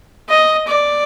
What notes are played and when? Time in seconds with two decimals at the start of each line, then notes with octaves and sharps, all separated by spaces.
0.29 D#5
0.67 D5